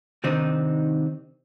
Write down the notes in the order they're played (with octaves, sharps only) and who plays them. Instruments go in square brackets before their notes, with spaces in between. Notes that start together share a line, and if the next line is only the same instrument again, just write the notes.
[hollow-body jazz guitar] C3 D#3 C4 D4 D#4